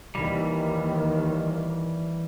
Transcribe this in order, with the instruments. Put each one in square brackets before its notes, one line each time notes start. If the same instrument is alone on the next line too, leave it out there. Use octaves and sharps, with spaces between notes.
[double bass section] D#2 D#3 [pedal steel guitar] E3 G3